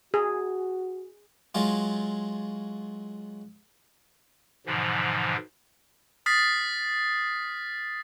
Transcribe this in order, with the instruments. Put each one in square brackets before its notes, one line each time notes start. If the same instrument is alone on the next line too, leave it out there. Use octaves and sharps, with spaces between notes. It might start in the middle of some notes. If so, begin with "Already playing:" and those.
[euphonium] F#4 [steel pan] G#4
[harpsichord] F#3 G#3 F4
[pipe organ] G#2 B2 D3 E3 F3
[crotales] D#6 F6 A6 B6 C7